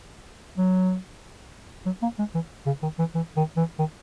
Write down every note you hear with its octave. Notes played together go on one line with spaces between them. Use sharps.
F#3
F#3
A#3
G#3
E3
C#3
D#3
E3
E3
D#3
E3
D#3